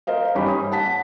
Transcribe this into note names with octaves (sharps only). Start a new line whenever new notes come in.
A#4 C5 D#5 F5
G2 C#4 D#4 G4 C#5 B5
D#6
F#5 A5 B6